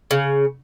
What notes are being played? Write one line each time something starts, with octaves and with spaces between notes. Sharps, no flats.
C#3